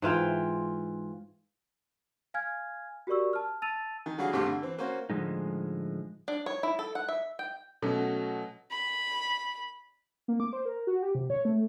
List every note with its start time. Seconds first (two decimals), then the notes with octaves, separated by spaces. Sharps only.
0.02 G#2 E3 F4 G5
2.34 F5 G#5 F6 G#6
3.07 F#4 G4 A#4 D5 C#6 E6
3.33 A5 F6
3.62 A5 E6 A6 D#7 F7
4.06 D#3
4.18 D3 F#3 G3 F#4 G#4 F5
4.33 G#1 G2 C3 A3 G4 C6
4.47 D3
4.62 E3 C4
4.79 A#3 C#4 F#4 C5
5.10 A2 D3 F3 G#3 D#4
6.28 D4
6.46 C#5
6.63 E4
6.79 A4
6.95 F#5
7.09 E5
7.39 G5
7.82 B2 F#3 A3 C#4
8.71 B5
10.28 A#3
10.40 D6
10.53 C5
10.65 A#4
10.87 F#4
11.02 G4
11.15 C3
11.30 C#5
11.45 A3